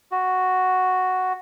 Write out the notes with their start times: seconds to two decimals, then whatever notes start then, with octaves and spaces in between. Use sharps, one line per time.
0.12 F#4